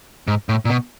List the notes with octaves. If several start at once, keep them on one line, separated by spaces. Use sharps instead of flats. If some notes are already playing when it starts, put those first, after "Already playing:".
G#2
A2
A#2
B2